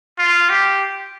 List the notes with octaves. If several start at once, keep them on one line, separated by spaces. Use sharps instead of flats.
F4
G4